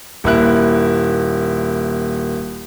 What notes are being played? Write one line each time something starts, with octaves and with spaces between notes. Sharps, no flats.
D#1 A#3 E4 F#6